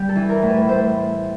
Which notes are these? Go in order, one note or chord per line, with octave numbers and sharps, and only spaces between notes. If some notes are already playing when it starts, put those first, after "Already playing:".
Already playing: G3 G4
A4
E3
A#4
A2
B4
A2 C5